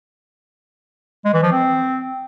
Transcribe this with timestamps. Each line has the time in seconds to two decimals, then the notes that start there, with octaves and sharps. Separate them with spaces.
1.25 G#3
1.34 E3
1.43 F3
1.52 C4